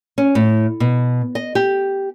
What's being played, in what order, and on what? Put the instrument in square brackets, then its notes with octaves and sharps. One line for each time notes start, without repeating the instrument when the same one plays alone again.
[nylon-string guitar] C#4
A2
B2
D#5
G4